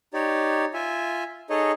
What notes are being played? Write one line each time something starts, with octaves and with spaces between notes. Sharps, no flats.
D#4 G4 C#5 D5
F4 E5 G#5
D#4 G#4 A4 C#5 D#5